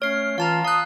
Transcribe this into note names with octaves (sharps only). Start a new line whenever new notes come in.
A3 C#4 C#5 F6 C7
E3 F4 F5 A5 A#5
F5 D#6 F#6